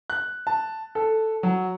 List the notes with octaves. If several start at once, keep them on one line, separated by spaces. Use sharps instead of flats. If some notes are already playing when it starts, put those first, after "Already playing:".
F#6
A5
A4
F#3